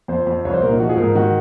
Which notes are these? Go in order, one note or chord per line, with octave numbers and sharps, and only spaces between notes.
F2 C5
F2
C2 C#5
C5
A#2 A#4
D#4
F3 F#4
G#4
G#2 A#4
D#3 F#4